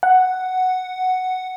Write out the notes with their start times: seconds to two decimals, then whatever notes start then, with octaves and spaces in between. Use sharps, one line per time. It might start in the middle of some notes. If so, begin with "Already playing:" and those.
0.03 F#5